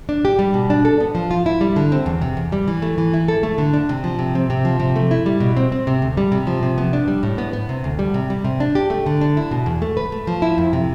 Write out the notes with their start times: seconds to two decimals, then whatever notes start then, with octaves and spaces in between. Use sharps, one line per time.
0.09 D4
0.25 G4
0.39 G3
0.54 B2
0.70 D4
0.85 A4
1.00 B3
1.15 F3
1.31 F4
1.46 E4
1.61 G3
1.76 D3
1.92 C4
2.06 E2
2.22 C3
2.37 E2
2.52 G3
2.68 E3
2.82 A3
2.98 E3
3.14 E4
3.28 A4
3.43 A3
3.58 D3
3.73 D4
3.89 C3
4.04 F3
4.19 C3
4.35 C4
4.50 C3
4.65 F3
4.80 C3
4.96 A3
5.11 E4
5.26 G3
5.40 B2
5.57 C4
5.72 C4
5.87 C3
6.02 D2
6.17 G3
6.32 C3
6.47 F3
6.63 C3
6.78 B3
6.93 D4
7.08 G3
7.23 A2
7.38 B3
7.53 B3
7.69 C3
7.84 D2
7.99 G3
8.14 C3
8.30 G3
8.44 C3
8.60 D4
8.75 G4
8.90 A3
9.06 D3
9.21 D4
9.37 E4
9.51 B2
9.66 E2
9.82 A3
9.97 B4
10.12 A3
10.27 F3
10.42 E4
10.58 F2
10.73 C3